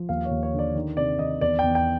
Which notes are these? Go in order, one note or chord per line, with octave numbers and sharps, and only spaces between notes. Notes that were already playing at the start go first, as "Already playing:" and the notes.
Already playing: F3
D#2 F5
C#5
D#2
C#5
D3 D5
D#3
C3 D5
D#3 D#5
E2 D5
E2 G5
G5